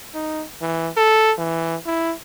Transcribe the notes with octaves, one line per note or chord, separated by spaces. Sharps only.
D#4
E3
A4
E3
E4